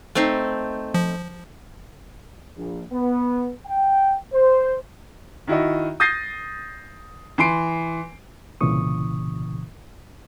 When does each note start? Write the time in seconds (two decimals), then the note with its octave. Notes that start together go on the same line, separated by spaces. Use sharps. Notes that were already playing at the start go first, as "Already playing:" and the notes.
0.15 A3 C4 D#4
0.94 F3
2.56 A#1
2.92 B3
3.66 G5
4.33 C5
5.47 D#3 E4 F#4 D#5
6.00 D#6 G6 A6 A#6 C7 D#7
7.38 E3 C6 C7 D7
8.61 C2 A#2 C#3 E3 C#6 D#6